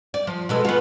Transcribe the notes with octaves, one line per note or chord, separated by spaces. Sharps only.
D5
F3
B2 G#3 A4
B3 F4